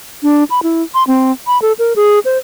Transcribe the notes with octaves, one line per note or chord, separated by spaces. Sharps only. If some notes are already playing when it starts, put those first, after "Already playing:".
D4
B5
E4
C6
C4
B5
A4
A#4
G#4
C5